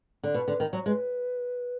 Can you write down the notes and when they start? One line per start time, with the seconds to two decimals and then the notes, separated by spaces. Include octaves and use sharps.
0.23 D3
0.34 B2 B4
0.48 D3
0.60 D#3
0.73 F#3
0.86 G#3 B4